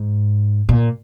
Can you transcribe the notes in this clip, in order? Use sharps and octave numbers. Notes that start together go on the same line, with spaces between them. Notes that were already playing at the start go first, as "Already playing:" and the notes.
Already playing: G#2
A#2